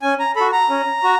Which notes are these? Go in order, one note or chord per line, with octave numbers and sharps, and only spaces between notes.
C#4 G#5
A#5
F#4 A4 B5
A#5
C#4
F#4